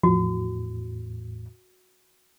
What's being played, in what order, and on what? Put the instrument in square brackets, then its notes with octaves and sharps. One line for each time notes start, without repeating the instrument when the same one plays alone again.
[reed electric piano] E2 A2 [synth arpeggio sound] F3 [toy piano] F#4